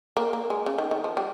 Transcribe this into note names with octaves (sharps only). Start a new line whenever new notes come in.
A#3
A#3
G#3
C#3
D#3
D#3
F3
G3